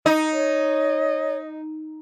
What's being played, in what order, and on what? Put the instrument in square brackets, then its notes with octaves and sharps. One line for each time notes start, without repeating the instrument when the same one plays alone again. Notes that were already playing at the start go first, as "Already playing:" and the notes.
[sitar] D#4 [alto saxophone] D#5
[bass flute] C#5